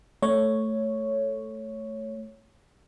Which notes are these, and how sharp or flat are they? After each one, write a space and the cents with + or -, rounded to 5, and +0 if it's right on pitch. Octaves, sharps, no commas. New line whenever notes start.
A3 +0 C#5 +0